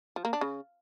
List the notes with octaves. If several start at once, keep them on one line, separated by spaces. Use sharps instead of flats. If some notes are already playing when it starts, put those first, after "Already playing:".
F3
A#3
D4
C#3